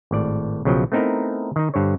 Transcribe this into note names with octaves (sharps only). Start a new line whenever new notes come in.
G#1 A2 D5
B1 C#3 F3 F#3 G5
A3 B3 C4 D#4 E4 A#4
D#3 D#4
G2 D3 C5 C#5